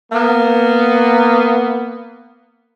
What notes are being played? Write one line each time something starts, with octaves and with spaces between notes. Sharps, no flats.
A#3 B3